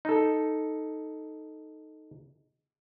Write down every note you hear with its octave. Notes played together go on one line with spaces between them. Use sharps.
D#4 A4